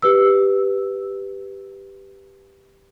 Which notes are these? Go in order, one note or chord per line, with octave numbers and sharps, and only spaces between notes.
G4 B4 E6